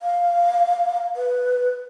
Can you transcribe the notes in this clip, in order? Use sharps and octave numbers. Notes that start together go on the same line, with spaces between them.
F5
B4